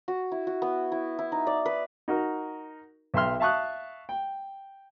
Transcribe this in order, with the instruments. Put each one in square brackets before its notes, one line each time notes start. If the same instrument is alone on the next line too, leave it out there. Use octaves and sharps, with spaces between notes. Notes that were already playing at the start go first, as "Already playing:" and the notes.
[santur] F#4
E4
F#4
B3
E4
E4
D#4
D5
B4
[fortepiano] D#4 F#4 A#4
B1 E5 G5 C6 F6
E5 F5 A5 C#6 D#6 F#6
G5